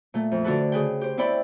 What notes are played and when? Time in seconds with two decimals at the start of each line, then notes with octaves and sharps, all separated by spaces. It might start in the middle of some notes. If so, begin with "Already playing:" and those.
0.14 A#2 A3
0.32 F2
0.44 D3 D4 F#4 A4 B4
0.72 C#3 G#4 B4 G5
1.01 G4 C5
1.17 C4 E4 C#5 D5 G5 B5